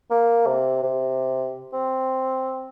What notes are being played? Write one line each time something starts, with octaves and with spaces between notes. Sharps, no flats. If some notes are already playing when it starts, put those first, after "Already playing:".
A#3
C3
C3
C4